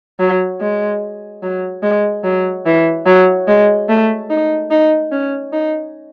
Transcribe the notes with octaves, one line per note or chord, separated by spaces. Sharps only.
F#3
G#3
F#3
G#3
F#3
E3
F#3
G#3
A3
D#4
D#4
C#4
D#4